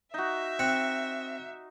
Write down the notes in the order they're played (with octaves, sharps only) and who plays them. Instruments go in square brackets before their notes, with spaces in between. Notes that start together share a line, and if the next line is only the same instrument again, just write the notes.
[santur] D#4 F#4 [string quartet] E5
[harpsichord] C4 [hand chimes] F#6 C#7